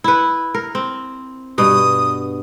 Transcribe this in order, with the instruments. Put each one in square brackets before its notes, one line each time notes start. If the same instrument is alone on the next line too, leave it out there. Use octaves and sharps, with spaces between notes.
[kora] E4 B4
A#4
C4
[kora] G2 B2 [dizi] D#6